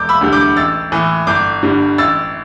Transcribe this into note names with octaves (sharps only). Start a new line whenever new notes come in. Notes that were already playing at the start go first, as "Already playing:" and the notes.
Already playing: E1 D6 G6
B5 E6
D2 D3 G3
D6 G6
A1 E6 A6
A2 E3
G1 D6 G6
G2 D3 G3
A1 E6 A6